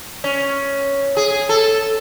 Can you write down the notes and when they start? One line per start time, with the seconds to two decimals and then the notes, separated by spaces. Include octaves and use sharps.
0.24 C#4
1.17 G#4
1.49 A4